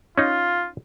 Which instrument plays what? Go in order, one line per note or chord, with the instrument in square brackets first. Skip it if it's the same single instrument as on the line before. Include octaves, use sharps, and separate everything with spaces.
[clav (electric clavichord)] C#4 D#4 [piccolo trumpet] F4